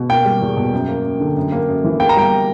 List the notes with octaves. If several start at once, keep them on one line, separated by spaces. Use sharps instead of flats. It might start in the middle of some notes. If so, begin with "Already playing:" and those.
Already playing: B2
A#3 G5
G3
E2
B2
F#2
A#3
F#2
D3
F#2
A#3
F#2
E3
A#3 G5
A#5
G3 G5